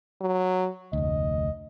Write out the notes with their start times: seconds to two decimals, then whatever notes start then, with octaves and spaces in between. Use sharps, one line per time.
0.21 F#3
0.93 F1 D2 D#5